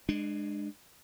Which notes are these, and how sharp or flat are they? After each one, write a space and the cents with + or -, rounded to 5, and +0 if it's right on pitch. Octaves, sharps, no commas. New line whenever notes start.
G#3 +0 D4 +30